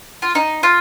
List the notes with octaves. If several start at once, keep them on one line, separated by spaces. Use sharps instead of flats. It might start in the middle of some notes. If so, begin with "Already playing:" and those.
F4
D#4
F4